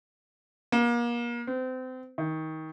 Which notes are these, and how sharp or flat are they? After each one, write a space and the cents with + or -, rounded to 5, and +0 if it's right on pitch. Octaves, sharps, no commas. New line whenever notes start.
A#3 +35
C4 -30
D#3 +25